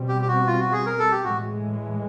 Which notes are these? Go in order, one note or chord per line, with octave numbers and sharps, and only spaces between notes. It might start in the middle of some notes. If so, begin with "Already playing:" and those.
Already playing: B2 G3 C4
G4
G4
F#4
F4
F#4
G#4
A#4
A4
G4
A2 E3 G#3 F#4